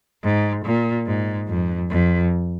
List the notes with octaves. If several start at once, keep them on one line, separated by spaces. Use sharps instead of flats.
G#2
A#2
G#2
F2
F2